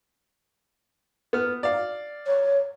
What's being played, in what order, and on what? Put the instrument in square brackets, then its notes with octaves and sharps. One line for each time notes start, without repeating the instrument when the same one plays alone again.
[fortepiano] B3 F6
D5 F5
[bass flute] C#5